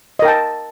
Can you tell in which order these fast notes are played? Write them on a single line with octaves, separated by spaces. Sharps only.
D#5 A#4 G5 A5